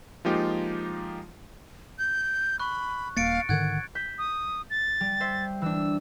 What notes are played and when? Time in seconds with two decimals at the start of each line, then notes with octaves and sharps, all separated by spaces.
0.25 F3 G#3 A#3 D#4 F4 G4
1.99 G6
2.60 B5 C#6 F#6
3.17 D#1 A#3 F5 A6 C#7 D7
3.49 G#2 D3 D#3 F#5 F#6 G#6
3.95 G6 B6 E7
4.18 D#6
4.70 A6
5.00 G3
5.20 C5 E5
5.62 E3 D4 E6